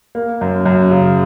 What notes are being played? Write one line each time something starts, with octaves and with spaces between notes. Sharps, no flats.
A#3
F#2
F#2
C#3